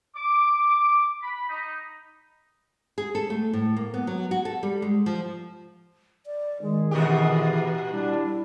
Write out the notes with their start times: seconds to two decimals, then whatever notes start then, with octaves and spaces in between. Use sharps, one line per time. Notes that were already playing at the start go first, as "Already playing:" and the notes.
0.16 D6
1.23 B5
1.50 D#4
2.98 G#4
3.15 A4
3.30 A3
3.53 A2
3.76 A#3
3.94 B3
4.07 F#3
4.31 F#4
4.45 A4
4.63 G3
4.82 G#3
5.06 F3
6.26 D5
6.62 D#3 G#3 G#4
6.91 A#2 E3 F#4 G4
7.92 G3 D4 E4